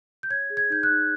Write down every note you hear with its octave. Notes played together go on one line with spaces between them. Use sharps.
G6
C#5 G#6
G#4
G#6
D#4 G6
F#6
D#4